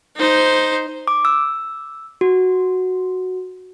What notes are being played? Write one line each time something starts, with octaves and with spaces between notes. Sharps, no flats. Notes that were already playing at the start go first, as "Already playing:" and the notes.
D#4 C5
D6
E6
F#4